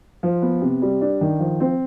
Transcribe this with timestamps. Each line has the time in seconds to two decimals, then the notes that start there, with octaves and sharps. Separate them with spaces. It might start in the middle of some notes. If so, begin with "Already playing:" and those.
0.23 F3
0.42 B3
0.62 C3
0.82 G3
1.01 D4
1.21 D#3
1.39 F3
1.60 C4